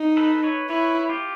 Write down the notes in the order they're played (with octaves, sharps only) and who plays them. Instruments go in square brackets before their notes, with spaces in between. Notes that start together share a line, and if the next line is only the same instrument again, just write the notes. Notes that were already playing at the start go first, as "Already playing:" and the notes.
Already playing: [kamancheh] D#4
[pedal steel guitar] A4 B4
B4 C#5
[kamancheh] E4 [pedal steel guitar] B4 C#5
[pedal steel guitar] F4 G4